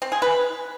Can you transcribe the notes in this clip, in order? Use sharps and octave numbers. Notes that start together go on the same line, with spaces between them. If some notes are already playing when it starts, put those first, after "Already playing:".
C4
G#4
B4